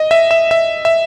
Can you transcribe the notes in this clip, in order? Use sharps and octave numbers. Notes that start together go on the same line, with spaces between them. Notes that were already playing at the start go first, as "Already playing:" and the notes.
Already playing: D#5
E5
E5
E5
E5